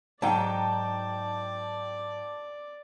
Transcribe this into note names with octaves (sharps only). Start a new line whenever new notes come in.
G#2 F#3 D#4 D5 G5 A5